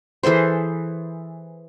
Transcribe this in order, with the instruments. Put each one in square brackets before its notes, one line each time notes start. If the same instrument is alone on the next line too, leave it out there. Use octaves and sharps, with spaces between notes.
[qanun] E3 G#4 A4 C5